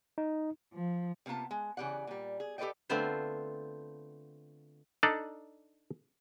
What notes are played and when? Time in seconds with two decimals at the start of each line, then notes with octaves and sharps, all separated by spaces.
0.18 D#4
0.73 F3
1.26 C3 A#3 B3 F4 A5
1.51 G#3
1.77 C#3 E3 G4 D5 F#5
2.07 A#2 G3
2.40 G#4
2.58 G4 A4 B4 D5 D#5 G5
2.89 D3 A3 B3 C4 F4 C5
5.03 D4 D#4 A4 D5